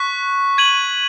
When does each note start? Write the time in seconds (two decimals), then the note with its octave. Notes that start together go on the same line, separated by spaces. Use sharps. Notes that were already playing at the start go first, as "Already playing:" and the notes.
Already playing: C#6 F#6 B6
0.58 G#6 D#7 F#7